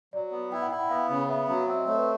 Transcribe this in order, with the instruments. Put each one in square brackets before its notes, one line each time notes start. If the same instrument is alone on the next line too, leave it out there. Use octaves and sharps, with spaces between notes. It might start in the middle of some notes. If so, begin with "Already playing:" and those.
[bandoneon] F#3 [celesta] D5
[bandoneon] B3
[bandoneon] E4 [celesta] G5
[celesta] F#5
[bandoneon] E4 [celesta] G5
[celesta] F#5
[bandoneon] B3 [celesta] F5
[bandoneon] C#3
[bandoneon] B3 [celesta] E5
[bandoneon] F#3
[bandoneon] C4 [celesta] E5
[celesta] D#5
[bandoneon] A3 [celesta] C#5
[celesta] B4